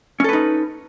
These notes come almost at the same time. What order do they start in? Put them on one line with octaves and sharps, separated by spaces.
C#4 A4 B4 D#4